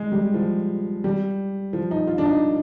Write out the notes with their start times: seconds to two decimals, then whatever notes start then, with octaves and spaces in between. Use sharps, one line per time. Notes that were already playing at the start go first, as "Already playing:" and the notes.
Already playing: G#3
0.12 G3
0.34 F3
1.04 G3
1.73 F3
1.91 D#4
2.07 F4
2.18 D4
2.25 D#4